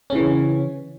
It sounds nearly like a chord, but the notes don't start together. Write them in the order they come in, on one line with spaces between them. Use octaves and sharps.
C#4 C#3 E3